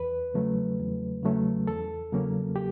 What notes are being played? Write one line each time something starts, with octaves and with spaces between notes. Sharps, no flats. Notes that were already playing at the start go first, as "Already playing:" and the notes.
Already playing: E2 B4
C#3 F#3 A3 C#4
E2
C#3 F#3 A3 C#4
E2 A4
C#3 F#3 A#3 C#4
G4